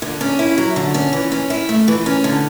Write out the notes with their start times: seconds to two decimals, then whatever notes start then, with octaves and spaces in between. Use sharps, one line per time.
0.02 D3
0.21 C#4
0.39 E4
0.58 F#3
0.76 D3
0.94 C#4
1.13 E3
1.32 C#4
1.50 E4
1.69 A3
1.88 E3
2.06 C#4
2.24 D3